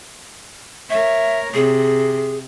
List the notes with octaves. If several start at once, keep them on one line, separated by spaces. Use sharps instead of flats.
A#4 C#5 E5
C3 G#4